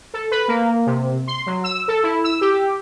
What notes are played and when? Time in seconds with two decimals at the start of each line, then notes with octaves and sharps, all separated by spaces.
0.14 A4
0.31 B4
0.48 A#3
0.87 C3
1.27 C6
1.46 F#3
1.64 E6
1.88 A4
2.03 E4
2.24 E6
2.41 G4